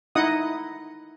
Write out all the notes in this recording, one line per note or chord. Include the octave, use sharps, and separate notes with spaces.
D#4 E4 D#5 F#5 D#6